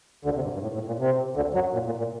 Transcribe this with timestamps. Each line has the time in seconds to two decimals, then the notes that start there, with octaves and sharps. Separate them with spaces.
0.25 D2 D3
0.35 C3
0.43 G2
0.54 G2
0.62 A2
0.74 A2
0.87 A#2
0.99 C3
1.36 D2 D3
1.54 F#2 F#3
1.74 A#2
1.86 A#2
1.98 A#2